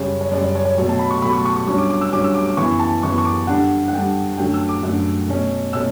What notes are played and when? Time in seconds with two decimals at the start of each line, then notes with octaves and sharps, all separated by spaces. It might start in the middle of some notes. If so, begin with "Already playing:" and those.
Already playing: F#2 C#3 G3 C#5
0.21 C#5
0.31 F#2 C#3 G3 D5
0.43 D5
0.55 C#5
0.61 D5
0.65 C#5
0.78 B2 F#3 A3 C#5
0.89 A5
0.99 B5
1.11 C#6
1.22 B2 F#3 A3 B5
1.33 C#6
1.45 C#6
1.56 C#6
1.67 G2 F#3 C#4 C#6
1.78 D6
1.90 D6
2.01 E6
2.12 G2 F#3 C#4 D6
2.24 E6
2.34 D6
2.46 D6
2.57 F#2 E3 B3 C#6
2.80 A5
3.03 F#2 E3 B3 C#6
3.18 C#6
3.25 D6
3.47 G2 D3 G3 D4 F#5
3.88 F#5
3.92 G2 D3 G3 D4 G5
4.37 F#2 D3 F#3 A3 G5
4.54 E6
4.69 D6
4.83 F#2 D3 F#3 A3
5.28 B2 A3 C#4
5.73 B2 A3 C#4 E6